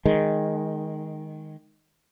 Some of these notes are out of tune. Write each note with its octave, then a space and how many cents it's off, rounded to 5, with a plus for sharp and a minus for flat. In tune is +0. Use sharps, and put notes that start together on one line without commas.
D#3 +0 G#3 +0